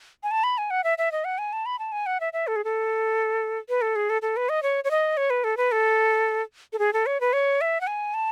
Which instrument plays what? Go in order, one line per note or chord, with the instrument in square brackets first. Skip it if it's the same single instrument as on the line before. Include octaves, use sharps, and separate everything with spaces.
[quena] G#5
A5
B5
G#5
F#5
E5
E5
D#5
F#5
G#5
A5
B5
A5
G#5
F#5
E5
E5
A4
G#4
A4
B4
A4
G#4
A4
A4
B4
D#5
C#5
C#5
D#5
C#5
B4
A4
B4
A4
A4
G#4
A4
C#5
B4
C#5
E5
F#5
G#5
A5